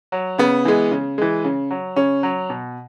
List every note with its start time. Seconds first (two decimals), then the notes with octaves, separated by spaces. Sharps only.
0.12 F#3
0.38 C#3 B3
0.65 E3 G#3
0.91 C#3
1.18 E3 G#3
1.45 C#3
1.71 F#3
1.96 C#3 C#4
2.23 F#3
2.50 B2